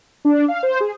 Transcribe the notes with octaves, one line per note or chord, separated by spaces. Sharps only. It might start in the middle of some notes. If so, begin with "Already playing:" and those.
D4
F5
C5
G#4